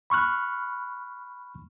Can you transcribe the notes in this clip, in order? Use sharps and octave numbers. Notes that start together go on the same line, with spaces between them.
B5 C#6 F6 F#6